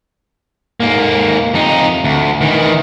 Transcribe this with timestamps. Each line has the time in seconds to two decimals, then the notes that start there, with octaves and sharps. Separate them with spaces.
0.80 G#2 A#3
1.54 F2 D#4
2.04 D2
2.41 D#3 E3